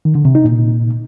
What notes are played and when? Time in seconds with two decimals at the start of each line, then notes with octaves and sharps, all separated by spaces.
0.05 D#3
0.15 D3
0.25 C3
0.35 D#4
0.45 A#2